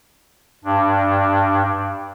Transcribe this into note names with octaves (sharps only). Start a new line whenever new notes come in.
G2 D4